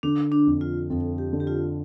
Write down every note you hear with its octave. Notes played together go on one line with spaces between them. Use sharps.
D3 D4
D4
F2
F4
F2 A4
G4
D3
G4
F4